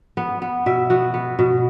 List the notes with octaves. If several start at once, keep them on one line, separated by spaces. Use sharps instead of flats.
B3
B3
B2 E5
B3 F#4
B3
B2